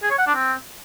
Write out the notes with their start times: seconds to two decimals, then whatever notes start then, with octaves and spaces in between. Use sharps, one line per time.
0.02 G#4
0.10 C#5
0.19 F#5
0.27 D4
0.35 C4